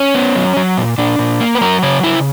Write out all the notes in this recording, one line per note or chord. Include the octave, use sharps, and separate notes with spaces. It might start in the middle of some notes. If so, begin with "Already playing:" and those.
Already playing: C#4
B3
F#3
F#3
A#2
A#2 D4
A#2
A#3
B4
F#3 A#4
C#3 C#5
C#3 E4